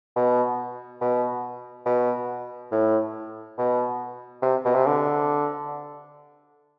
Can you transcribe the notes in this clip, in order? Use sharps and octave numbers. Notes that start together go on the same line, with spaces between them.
B2
B2
B2
A2
B2
C3
B2
C3
D3